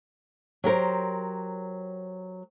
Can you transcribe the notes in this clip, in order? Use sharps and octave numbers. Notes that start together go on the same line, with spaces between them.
F#3 G4 A#4 C5